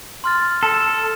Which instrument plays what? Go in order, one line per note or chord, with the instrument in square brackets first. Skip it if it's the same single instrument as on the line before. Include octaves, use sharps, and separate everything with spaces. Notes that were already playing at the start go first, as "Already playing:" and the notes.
[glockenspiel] C6 F6 A6
[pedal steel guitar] A4